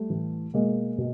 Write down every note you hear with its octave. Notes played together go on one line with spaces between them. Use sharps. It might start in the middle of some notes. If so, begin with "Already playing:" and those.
Already playing: G3 A3
A2 E3
B2 G#3 A#3
B2